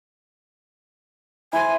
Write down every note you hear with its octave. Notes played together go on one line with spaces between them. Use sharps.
E4 C5 G#5